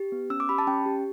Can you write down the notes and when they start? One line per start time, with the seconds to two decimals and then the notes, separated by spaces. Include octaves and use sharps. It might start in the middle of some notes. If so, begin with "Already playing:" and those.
Already playing: G4
0.12 B3
0.30 C#4 E6
0.40 D6
0.49 G4 B5
0.58 A5
0.67 C#4 G5
0.86 G4